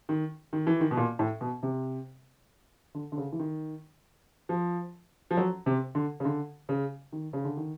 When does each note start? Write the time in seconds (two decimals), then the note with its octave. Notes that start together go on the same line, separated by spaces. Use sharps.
0.09 D#3
0.53 D#3
0.67 E3
0.81 D#3
0.91 B2
0.97 A#2
1.19 A2
1.41 B2
1.63 C3
2.94 D3
3.12 D3
3.17 C#3
3.32 E3
3.39 D#3
4.49 F3
5.31 F3
5.37 F#3
5.66 C3
5.95 D3
6.20 C#3
6.25 D3
6.69 C#3
7.12 D#3
7.33 C#3
7.44 D3
7.57 D#3